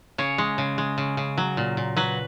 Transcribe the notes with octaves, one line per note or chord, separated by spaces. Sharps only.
C#3 C#5
G#3
C#3
G#3
C#3
C#3
F#3
A#2
A#2
F#3 B4